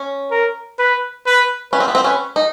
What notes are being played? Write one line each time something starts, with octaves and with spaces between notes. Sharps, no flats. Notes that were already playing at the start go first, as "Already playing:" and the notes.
Already playing: C#4
A#4
B4
B4
C#4 B4
C4
B3
C4
C#4 B4
D#4